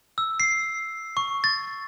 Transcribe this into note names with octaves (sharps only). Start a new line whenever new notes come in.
E6
C7
C#6
A6